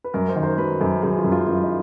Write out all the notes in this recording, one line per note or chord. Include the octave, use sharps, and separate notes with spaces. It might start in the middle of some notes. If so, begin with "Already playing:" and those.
B4
F#2 A#4
C5
D#3
C5
F#3 B4
F#2 A4
F#2 G#4
F4
F#2
F4
F#2 E4
D#4